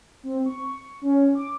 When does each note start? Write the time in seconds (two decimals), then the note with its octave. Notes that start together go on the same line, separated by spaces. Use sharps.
0.23 C4
0.46 C#6
1.02 C#4
1.35 D6